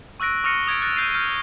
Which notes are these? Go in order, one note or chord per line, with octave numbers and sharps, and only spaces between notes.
C#6 E6 F#6 A#6 D7
C#6 D#6 F6 A#6 C#7
D#6 G#6 A6 D7
F#6 A6 A#6 C#7
F6 G6 A6 C7 D#7
F6 G6